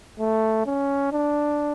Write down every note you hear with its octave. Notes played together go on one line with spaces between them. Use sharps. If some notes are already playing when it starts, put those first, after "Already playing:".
A3
C#4
D4